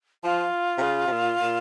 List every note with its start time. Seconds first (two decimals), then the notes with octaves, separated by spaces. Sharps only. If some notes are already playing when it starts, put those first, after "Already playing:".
0.24 F3 F4
0.78 C3
0.82 C#3
1.07 C3
1.12 A#2
1.42 A#2